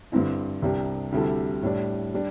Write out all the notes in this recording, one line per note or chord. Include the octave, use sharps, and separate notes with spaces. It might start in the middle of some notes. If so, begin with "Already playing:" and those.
G2 D3 C4 E4
C2 C3 G3 D4 G4
D2 C3 G3 E4 A4
A2 G3 D4
G3 D4